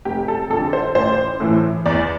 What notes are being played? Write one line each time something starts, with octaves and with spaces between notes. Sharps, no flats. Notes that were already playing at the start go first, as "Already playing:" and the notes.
F1 G4
A4
F2 D3 A4
C5
A1 C5
A2 E3
E2 D5